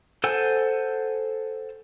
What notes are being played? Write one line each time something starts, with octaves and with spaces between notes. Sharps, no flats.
A4 C5 F#5 G#5 E6